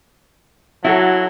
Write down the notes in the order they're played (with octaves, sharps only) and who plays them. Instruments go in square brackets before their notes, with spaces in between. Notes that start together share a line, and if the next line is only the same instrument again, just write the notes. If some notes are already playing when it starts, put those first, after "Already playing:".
[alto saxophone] F#3 [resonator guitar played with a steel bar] E4 F#4 A4